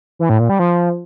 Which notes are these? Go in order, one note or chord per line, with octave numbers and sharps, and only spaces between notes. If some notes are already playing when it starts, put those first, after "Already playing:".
E3
A2
A#2
G3
F3